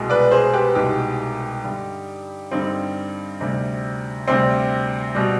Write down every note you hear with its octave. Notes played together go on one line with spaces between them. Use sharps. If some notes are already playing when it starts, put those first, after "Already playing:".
Already playing: C2 B2 G#3
B4 D5
G#4 C5
G4 B4
C2 B2 G#3 D#4 G4
G2 D3 G3
G2 D3 G3 C4 D#4
D2 C3 G3
D2 C3 G3 C4
B2 G3